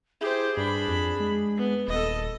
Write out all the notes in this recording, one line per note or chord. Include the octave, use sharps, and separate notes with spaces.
E4 G4 G#4 C5
G2 D4 B5
F2
G#3
B3
D#1 A4 D#5